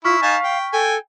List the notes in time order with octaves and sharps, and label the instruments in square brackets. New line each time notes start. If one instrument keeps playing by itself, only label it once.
[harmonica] E4 [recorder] F4 [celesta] C#6 F6 B6
[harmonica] D#4 G#5 A5 [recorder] F5
[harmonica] G5
[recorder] A4 [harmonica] G5 G#5